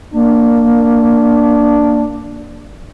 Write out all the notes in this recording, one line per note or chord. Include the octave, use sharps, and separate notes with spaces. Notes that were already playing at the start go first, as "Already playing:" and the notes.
A#3 D4